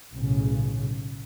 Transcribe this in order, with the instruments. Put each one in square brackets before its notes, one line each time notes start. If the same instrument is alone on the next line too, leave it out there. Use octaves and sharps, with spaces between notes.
[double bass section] B1 A2 C#3